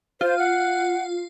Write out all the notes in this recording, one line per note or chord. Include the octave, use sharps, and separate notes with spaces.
F4 C5
F#5